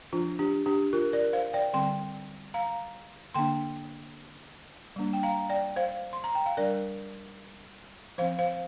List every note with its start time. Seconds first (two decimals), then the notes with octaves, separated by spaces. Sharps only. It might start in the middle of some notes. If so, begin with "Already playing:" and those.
0.13 F3 D4 F4
0.39 D4 G4
0.66 D4 G4
0.93 F4 A#4
1.13 A#4 D5
1.33 C5 F5
1.53 D5 G5
1.73 D3 G3 C4 G5 C6
2.54 F5 A#5
3.34 D3 A#3 D4 G5 C6
4.96 G3 A#3 D4
5.13 G5
5.23 F5 A#5
5.50 D5 G5
5.76 C5 F5
6.13 C6
6.24 A#5
6.35 G5
6.46 F5
6.57 G3 D4 A#4 D5
8.18 F3 C4 C5 F5
8.39 C5 F5